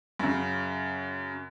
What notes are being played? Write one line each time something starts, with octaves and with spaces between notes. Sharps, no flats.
F#2 C#3